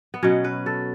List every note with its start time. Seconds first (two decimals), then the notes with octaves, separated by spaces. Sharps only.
0.14 B3
0.23 B2 F#3 C#4
0.44 B4
0.66 A4